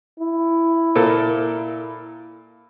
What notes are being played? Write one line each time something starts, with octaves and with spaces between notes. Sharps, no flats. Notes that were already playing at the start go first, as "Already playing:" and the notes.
E4
A#2 A#3 A4